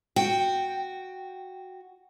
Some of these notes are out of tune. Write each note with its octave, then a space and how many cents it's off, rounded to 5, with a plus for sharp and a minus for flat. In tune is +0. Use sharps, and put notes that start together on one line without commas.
F#4 +0 G5 +0